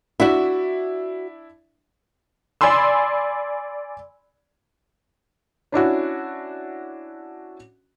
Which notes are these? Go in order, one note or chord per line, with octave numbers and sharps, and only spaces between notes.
D4 E4 F#4 E5
D5 G#5 B5 C6 E6
C#4 D4 E4 F#4